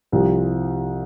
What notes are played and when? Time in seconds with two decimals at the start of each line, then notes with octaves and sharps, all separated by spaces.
0.12 C2 C3 F3